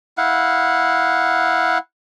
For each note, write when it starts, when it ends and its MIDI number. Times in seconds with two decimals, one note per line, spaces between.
0.18 1.78 64
0.18 1.78 77
0.18 1.78 78